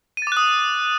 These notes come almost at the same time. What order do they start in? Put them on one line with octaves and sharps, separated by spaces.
D#7 A6 D6 F#6 D#6